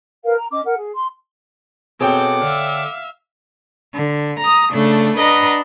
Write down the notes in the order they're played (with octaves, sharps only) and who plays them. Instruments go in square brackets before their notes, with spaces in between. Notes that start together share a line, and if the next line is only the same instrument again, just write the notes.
[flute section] A#4 B4 F5
A#5
C#4 D#5 D6
A#4 F#5
G#4
C6
[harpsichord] B2 G#4 [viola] C4 [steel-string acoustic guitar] A4 C#5 G5 [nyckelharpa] F#5 D6
[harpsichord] D3 [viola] E5 F5
[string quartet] D3
A#5 D#6
C#3 A3 D4
D4 B4 D#5 F#5 A#5